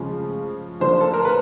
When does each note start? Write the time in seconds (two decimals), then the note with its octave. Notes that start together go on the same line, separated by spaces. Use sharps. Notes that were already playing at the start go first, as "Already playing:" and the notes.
Already playing: C#3 F3 G#3
0.80 D3 F3 A#3 C5
1.01 A4
1.14 A#4
1.25 B4